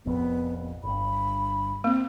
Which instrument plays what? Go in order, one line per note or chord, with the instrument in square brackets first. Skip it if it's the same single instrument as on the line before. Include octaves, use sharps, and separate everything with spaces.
[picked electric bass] F1 A#1 F2 [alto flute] B3
[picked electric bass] G1 G2 [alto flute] B5
[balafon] A#3 [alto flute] C4